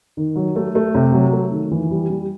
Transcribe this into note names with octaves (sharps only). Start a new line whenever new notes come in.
D#3
F#3
A3
A3
C3
F#3
A3
D#3
E3
G3
G3